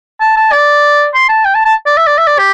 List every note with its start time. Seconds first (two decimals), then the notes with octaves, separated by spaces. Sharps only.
0.21 A5
0.37 A5
0.52 D5
1.14 C6
1.29 A5
1.45 G5
1.55 A5
1.65 A5
1.86 D5
1.97 E5
2.07 D5
2.18 E5
2.27 D5
2.38 G4